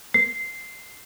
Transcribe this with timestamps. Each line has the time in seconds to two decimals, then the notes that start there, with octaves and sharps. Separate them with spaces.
0.14 C7